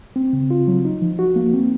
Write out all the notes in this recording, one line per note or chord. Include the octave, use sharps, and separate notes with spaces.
C4
C#3
F4
F#3
D#4
F3
F#4
A#3
C4